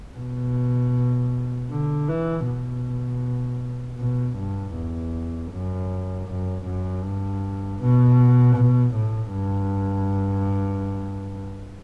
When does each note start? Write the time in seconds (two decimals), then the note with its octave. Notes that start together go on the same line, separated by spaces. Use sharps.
0.18 B2
1.71 D3
2.08 E3
2.47 B2
3.99 B2
4.38 G2
4.76 E2
5.52 F#2
6.28 F#2
6.66 F#2
7.04 G2
7.81 B2
8.56 B2
8.95 A2
9.33 G2